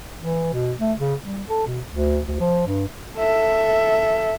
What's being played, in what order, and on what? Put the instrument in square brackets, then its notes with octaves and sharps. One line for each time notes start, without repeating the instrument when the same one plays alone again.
[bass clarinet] E3
B2
A3
C#3
G3
A4
B2
D2
D2
F3
G2
[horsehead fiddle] A4 E5